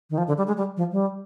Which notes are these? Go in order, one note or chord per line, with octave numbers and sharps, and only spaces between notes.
D#3
F3
D3
G3
G#3
G3
F3
G3